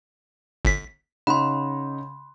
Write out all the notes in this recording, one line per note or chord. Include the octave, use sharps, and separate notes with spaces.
G1 B6
C#3 D#4 F#5 B5 C6